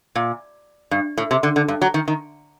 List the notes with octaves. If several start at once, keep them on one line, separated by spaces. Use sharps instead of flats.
A#2
G2
A2
C3
D3
D3
G2
F#3
D#3
D#3